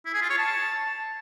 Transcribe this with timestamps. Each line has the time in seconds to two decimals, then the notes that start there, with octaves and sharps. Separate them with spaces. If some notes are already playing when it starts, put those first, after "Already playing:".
0.06 E4
0.14 G#4
0.22 F4
0.30 C#5
0.38 A5